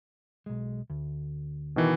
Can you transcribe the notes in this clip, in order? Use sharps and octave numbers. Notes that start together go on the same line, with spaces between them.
B1 G#3
D2
B2 D#3 E3